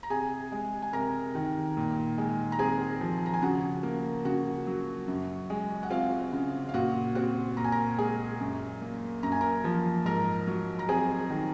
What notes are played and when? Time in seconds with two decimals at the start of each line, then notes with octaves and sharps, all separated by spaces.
0.03 A#5
0.10 C3 G#4 G#5
0.52 G#3
0.82 G#5
0.93 C3 A#4 A#5
1.35 D#3
1.77 A#2
2.18 G#3
2.52 A#5
2.59 C4 G#4 G#5
3.01 F3
3.26 A#5
3.34 G#5
3.42 C#3 F#4 F#5
3.83 A#3
4.25 C#3 F#4 F#5
4.67 F#3
5.08 F#2
5.50 G#3
5.83 F#5
5.90 C4 F4 F5
6.32 C#3
6.69 F5
6.74 A#2 F#4 F#5
7.15 C4 F#4 F#5
7.57 A#2 A#5
7.64 G#5
7.72 A#4 A#5
7.98 G#3 G#4 G#5
8.40 F#2
8.82 A#3
9.23 F#2 A#5
9.32 G#5
9.41 A#4 A#5
9.64 F3
10.05 G#2 A#4 A#5
10.47 F#3
10.79 A#5
10.89 C4 G#4 G#5
11.30 D#3